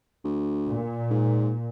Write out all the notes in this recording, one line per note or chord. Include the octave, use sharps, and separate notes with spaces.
D2
A#2
G#2